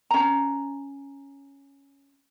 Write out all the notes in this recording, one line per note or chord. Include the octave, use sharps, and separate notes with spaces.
C#4 A#5